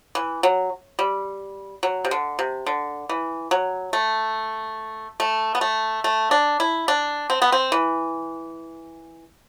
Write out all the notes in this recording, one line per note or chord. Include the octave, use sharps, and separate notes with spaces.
E3
F#3
G3
F#3
C3
D3
C3
D3
E3
F#3
A3
A3
B3
A3
A3
D4
E4
D4
C4
B3
C4
E3